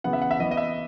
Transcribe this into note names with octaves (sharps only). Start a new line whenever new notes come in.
C#3 E3 B3 F#5
E5
F#5
E5
E3 B3 D#5
D#5
E5